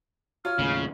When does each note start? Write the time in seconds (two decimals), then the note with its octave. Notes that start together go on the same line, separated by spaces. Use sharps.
0.45 F4 C#5 F6
0.59 D#2 A2 C#3